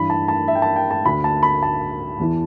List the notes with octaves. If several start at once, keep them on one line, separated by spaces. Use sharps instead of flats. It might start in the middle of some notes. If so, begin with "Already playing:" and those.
Already playing: G2 E3 B5
A5
A5
E5
G5
A5
G5
A5
D2 D3 B5
A5
B5
A5
E2 E3